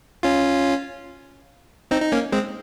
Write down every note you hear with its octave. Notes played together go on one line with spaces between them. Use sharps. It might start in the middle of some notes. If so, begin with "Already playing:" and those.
C#4 F4
C4 D#4
D#4
A#3 C#4
G#3 C4